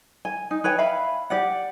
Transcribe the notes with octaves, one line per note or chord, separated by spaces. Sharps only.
G#5
D#4
B4 C#5 G5 G#5
E5 F5 B5
G4 D5 F#5